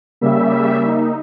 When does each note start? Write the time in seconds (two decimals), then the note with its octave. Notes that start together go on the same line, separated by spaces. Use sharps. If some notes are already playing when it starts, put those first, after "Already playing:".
0.21 C#3 G3 A#3 E5
0.86 D#4